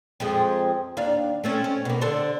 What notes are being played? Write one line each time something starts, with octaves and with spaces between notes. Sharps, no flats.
F2 F3 G#3
D#2 D4 F5
A3 C4 C#4
C#4
B2 A#3
D3 A4 C5